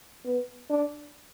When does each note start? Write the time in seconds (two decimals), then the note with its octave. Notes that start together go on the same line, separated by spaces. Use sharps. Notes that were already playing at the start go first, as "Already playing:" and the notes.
0.25 B3
0.70 D4